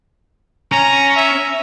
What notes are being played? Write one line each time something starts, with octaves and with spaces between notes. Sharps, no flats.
C#4 A#5
E5